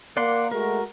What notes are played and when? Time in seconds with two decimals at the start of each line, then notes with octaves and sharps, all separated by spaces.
0.17 A#3 D5 F#5 C6
0.51 G#3 A3 F#4 A#4